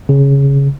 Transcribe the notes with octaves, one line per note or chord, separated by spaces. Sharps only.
C#3